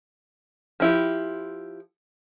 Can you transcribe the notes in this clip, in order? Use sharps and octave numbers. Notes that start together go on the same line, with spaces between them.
F3 E4 G4